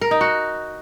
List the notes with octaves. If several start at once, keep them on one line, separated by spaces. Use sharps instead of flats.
A#4
D#4
F#4